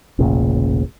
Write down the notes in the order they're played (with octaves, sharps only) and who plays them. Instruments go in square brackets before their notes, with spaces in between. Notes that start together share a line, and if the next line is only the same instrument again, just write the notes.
[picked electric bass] E1 A1 A#2 C#3